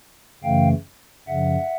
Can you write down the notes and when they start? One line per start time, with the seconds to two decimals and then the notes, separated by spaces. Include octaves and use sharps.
0.44 F#2 C#3 E3 A3 F5 G5
1.27 F#2 C#3 F3 E5 F#5